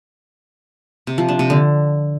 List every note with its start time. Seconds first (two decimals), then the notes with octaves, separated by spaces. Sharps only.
1.07 C3
1.18 F3
1.29 D4
1.39 C3
1.50 D3